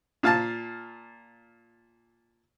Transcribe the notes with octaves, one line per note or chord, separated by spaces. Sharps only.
A#2 F5 A5